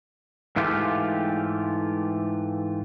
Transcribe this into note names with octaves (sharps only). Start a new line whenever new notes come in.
G#2 E3 A3 F4 G4